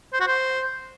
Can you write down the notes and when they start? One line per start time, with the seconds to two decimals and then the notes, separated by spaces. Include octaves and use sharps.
0.13 C5
0.20 F#4
0.27 C5